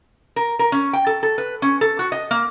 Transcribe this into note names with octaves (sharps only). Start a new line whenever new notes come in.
A#4
A#4
C#4
G5
A4
A4
B4
C#4
A4
F#4
D#5
A#3